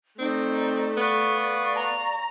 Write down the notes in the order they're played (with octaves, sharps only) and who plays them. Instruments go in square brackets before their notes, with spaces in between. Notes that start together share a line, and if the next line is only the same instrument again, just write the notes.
[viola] A3 [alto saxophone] C4 [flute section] D#4 D5
[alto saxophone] B3 [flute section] D5 F5 C#6
[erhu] A#5